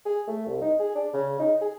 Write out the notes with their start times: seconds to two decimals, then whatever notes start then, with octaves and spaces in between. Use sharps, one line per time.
0.06 G#4
0.28 A3
0.47 C2
0.62 D#4
0.80 G#4
0.96 D4
1.13 C#3
1.39 D#4
1.61 G#4